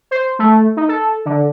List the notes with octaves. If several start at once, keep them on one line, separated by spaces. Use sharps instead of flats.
C5
A3
D#4
A4
D3